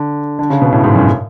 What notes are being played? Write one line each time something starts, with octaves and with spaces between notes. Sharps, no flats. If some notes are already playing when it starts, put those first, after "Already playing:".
Already playing: D3
D3
C#3
B2
A2
G#2
F#2